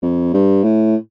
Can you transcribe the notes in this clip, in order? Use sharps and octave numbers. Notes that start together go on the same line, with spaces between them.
F2
G2
A2